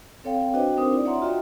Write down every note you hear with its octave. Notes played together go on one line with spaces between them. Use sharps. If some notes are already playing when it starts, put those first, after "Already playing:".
C4 A4 C#5 F5 G5
D4 F#4 B4 C5 D#5 G5
C4 D4 D#4 A#4 C5 D#6
E4 D5
C#5 E5 F#5 A#5 C6
F4 F#4 D#5 E5 G5